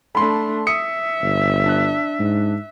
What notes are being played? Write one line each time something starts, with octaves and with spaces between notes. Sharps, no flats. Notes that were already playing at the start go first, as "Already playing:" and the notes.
A3 D4 B5 C6
E5 D#6 C#7
G1
D4 F#6
G#2